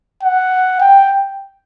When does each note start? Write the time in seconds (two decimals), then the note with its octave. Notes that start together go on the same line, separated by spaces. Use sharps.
0.23 F#5
0.81 G5